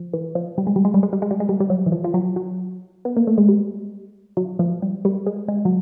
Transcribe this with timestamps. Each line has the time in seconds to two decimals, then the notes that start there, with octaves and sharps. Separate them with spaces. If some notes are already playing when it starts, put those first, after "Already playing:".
Already playing: F3
0.13 E3
0.35 F3
0.58 G3
0.67 G#3
0.76 G3
0.85 G#3
0.94 G3
1.03 G#3
1.13 G3
1.22 G#3
1.31 G3
1.40 G#3
1.49 G3
1.60 G3
1.70 F#3
1.86 E3
1.92 F3
2.04 F3
2.14 F#3
2.36 F#3
3.05 B3
3.17 A#3
3.27 A3
3.38 G#3
3.48 G3
4.37 F#3
4.59 F3
4.82 G3
5.05 G3
5.26 G#3
5.48 G#3
5.65 F#3